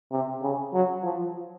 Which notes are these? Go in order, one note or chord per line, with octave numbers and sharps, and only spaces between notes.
C3
C#3
F#3
F3